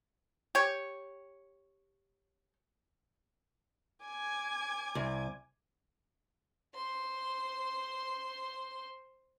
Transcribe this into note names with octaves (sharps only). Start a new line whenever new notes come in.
G4 C#5
G#5 D6 G#6
C2
C5 C6